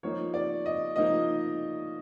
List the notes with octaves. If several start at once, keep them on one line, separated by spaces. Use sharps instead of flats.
F3 A#3 D#4 C#5
D5
D#5
F3 A#3 D#4 D#5